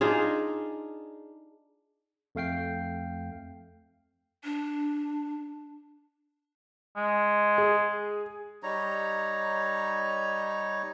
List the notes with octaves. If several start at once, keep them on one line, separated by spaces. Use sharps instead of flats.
D4 D#4 F4 G#4
F2 A3 F5 G5 C7
D4
G#3
G#4
G3 D#4 C#5 A#5